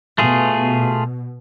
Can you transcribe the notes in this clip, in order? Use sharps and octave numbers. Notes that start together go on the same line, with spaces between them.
B2 A3 F4 G#4